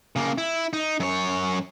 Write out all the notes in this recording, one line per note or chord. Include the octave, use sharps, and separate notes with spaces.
C#3 A#3
E4
D#4
F#2 C#5